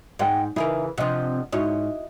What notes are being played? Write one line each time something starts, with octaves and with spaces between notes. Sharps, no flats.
G#2 D#5 F#5 G5
C#3 E3 D#4 E4 G#4 A#4
C3 F3 D4 D#5 F#5
G#2 E4 F#4 C#5 D#5